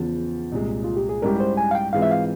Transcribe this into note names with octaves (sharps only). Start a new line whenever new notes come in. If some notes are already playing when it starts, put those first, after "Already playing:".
Already playing: E2 C#3 F3
C2 A#2 G#3
F4
G4
G#4
G#2 G3 C#4 E4 G4 A#4
C5
G#5
F5
G5
G#2 E3 G#3 C4 F4 F5
E5
F5